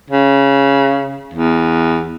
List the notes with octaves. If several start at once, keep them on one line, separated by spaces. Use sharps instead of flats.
C#3
E2